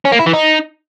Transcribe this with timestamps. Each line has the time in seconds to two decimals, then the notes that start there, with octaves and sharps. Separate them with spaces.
0.05 C#4
0.12 A#3
0.19 E4
0.26 E3
0.33 D#4